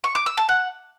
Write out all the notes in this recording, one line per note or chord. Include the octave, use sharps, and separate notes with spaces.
C#6
D6
E6
A5
F#5